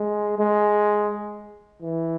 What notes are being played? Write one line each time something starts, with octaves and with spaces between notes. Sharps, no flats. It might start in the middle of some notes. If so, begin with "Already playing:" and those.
Already playing: G#3
G#3
E3